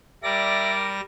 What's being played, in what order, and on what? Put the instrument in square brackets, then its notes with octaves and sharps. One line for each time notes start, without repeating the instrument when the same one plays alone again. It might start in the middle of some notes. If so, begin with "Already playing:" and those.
[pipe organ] G3 A#6 [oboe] A#4 [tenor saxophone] D5 [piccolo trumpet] E5